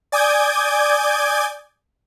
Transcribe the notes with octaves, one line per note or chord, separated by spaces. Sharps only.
D5 G#5 D6 D#6 G6 G#6